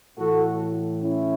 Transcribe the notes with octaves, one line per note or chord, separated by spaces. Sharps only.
A2 E3 F#4 A4
C#4 E4